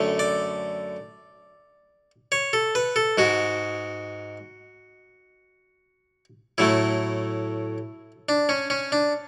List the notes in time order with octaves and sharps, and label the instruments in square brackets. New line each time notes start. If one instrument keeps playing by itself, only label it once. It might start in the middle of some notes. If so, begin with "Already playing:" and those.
Already playing: [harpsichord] F#2 D3 A3
D5
C#5
A4
B4
A4
G#2 G#3 F#4
A2 F#3 A3 E4
D4
C#4
C#4
D4